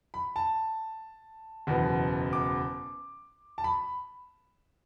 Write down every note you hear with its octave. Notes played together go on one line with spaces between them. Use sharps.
B5
A5
F#1 E2 B2 B3
D6
A5
B5